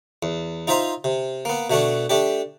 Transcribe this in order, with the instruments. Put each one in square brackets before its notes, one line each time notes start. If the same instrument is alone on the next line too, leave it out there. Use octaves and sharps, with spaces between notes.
[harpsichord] E2
D#4 F4 C5 E5 A#5 C6
C3
A#3 B3
B2 A3 D4 F#4
A3 D4 G4